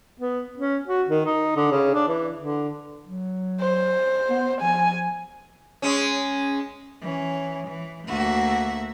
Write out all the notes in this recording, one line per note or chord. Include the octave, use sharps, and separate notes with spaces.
B3
C#4
F#4
D#3
D#4
D3
C#3
D4
E3
D3
F#3
C5
B3
F3 G#5
G#3 C#4
E3 C#4
E3
D2 A#3 F#4 E5